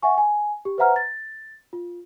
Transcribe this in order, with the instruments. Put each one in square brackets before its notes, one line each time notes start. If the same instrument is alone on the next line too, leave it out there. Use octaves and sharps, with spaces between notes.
[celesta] E5 F#5 G#5 C#6
G#5
G4
B4 C5 E5 F#5 A#5 F6
A6
F4